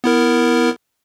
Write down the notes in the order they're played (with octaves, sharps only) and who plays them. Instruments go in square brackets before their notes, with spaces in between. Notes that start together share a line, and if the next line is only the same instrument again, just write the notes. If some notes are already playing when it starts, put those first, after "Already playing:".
[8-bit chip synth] B3 E4 A#4